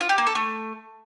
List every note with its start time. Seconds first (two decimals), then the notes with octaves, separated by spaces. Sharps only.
0.01 F4
0.09 G4
0.18 A#3
0.27 A4
0.35 A3